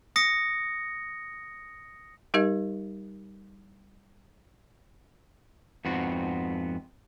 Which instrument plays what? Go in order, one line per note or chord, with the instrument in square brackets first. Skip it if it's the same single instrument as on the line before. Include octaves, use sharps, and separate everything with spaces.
[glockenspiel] D#6 A#6 C#7
[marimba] G3 D#4 G4 A#4 D#5
[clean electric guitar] F2 G#2 B3 C4 F#4